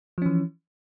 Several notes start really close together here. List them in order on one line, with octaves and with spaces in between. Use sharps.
F3 C#4 E3